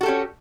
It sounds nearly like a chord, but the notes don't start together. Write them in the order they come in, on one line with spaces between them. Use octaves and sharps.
F#4 A4 G4 C#4